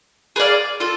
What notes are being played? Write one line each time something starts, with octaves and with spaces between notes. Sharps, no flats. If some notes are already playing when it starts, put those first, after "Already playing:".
G#4 B4 D5 F5
F4 A4